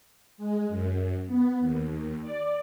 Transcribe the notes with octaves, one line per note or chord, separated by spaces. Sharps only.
G#3
F#2
B3
D#2
D5